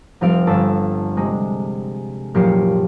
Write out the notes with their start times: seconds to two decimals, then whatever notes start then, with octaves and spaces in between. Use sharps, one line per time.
0.21 F1 F3 G3 C4 F5 D7
0.47 G1 A4 A5 E6
1.17 C3 G#3
2.34 F#1 A#2 F3 G4 C7 C#7